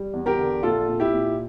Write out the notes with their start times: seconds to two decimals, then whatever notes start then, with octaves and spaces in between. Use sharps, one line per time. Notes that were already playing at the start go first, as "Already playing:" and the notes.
Already playing: G3
0.13 E2
0.26 G4 A#4
0.39 D3
0.63 A#1 F4 A4
0.88 A#2
1.00 E4 G4
1.13 A#2